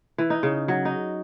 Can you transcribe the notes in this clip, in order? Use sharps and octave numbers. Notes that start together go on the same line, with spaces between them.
E3
D#4
C#3
F#3
D#4